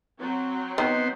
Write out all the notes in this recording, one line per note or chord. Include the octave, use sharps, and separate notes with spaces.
F#3 C4
D#3 B3 C5